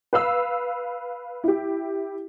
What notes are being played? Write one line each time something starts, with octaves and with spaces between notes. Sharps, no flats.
B4 F5 E6
E4 G4